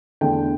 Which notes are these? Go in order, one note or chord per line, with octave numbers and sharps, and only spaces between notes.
E2 D3 A3 G5